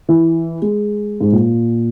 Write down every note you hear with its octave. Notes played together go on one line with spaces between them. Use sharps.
E3
G#3
G#2
A#2